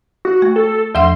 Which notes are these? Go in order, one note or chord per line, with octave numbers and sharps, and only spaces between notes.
F#4
A3
A4
E2 F3 F#5 C6